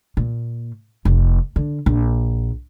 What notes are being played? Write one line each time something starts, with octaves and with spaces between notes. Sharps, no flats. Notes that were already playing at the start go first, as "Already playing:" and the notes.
A#2
F1
D3
A#1